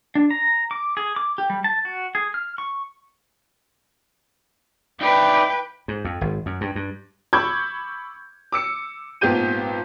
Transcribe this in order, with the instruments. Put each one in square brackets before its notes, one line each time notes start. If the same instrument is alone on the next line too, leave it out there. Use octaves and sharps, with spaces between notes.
[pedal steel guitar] D4
A#5
D6
G#4
D6
G4
G3
A5
F#4
G#4
F6
C#6
[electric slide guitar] D#4 E4 D5 [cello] B4 G5
[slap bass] G#2
F2
G#1
F#2
G2
G2
[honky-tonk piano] B5 C#6 D6 E6 G6 G#6
D6 E6 C#7
G#1 A#2 B3 G4 G6 D#7